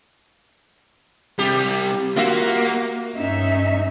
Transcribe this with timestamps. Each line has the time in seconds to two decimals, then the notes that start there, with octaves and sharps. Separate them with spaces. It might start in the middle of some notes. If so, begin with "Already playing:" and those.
1.39 C3 G3 G4
2.17 A#3 F4 F#4 E5
3.17 G2 C#4 D#4 E5